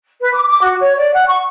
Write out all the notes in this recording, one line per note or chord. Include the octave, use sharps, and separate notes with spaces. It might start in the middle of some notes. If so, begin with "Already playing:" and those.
B4
D6
D6
F#4
C#5
D5
F#5
C#6